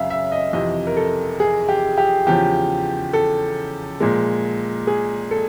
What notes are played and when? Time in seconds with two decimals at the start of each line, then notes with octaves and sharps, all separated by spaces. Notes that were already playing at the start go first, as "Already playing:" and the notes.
Already playing: F#2 C#3 E5 F5
0.10 E5
0.32 D#5
0.53 F2 C3 E3 D#5
0.87 A#4
0.96 A4
1.40 G#4
1.68 G4
1.98 G4
2.26 E2 C#3 F3 G4
3.13 A4
4.00 A#2 F3 G#3
4.87 G#4
5.31 A4